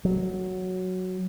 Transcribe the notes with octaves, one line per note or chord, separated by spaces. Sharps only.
F#3